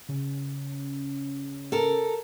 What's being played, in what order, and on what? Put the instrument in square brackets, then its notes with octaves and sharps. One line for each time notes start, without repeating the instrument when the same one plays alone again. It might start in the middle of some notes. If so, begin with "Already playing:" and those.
[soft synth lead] C#3
[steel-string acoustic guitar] A4 A#4